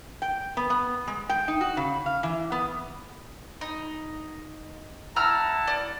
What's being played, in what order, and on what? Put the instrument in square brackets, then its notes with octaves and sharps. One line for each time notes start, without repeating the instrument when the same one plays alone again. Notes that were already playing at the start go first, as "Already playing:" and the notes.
[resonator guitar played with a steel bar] G5
B3
B3
G#3
G5
D#4
F#4
C#3
F5
E3
B3
[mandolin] D#4
[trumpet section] E4 F#5 A5 [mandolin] A#5 E6 F6
[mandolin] D5